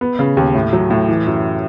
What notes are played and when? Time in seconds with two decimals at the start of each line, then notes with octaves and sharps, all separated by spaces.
0.01 B3
0.19 C#3
0.37 D#2
0.54 A2
0.73 F#3
0.90 A2
1.09 E3
1.27 F#2